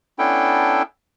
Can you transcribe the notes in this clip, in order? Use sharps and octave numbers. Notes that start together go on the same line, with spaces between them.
B3 C#4 D4 E4 A4 G5